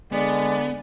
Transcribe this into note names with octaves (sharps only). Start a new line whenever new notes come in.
D3 G#3 B3 D5